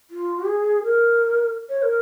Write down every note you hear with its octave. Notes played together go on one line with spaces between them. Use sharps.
F4
G#4
A#4
C#5
A#4